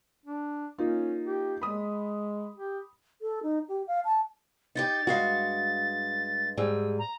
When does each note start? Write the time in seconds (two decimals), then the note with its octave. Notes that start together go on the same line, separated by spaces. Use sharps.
0.25 D4
0.78 A#3 C#4 D#4 F4
1.25 G4
1.61 G#3 B5 D#6
2.55 G4
3.22 A4
3.43 D#4
3.69 G4
3.87 F5
4.05 A5
4.75 D#4 E4 G4 A6
5.07 G2 G#3 F#4 F5
6.57 G#2 G3 G#4 E6
6.98 A#5